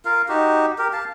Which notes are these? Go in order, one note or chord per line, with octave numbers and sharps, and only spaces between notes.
F4 A#4 F5
D#4 F#4 G4
G4 A#4
F5 A5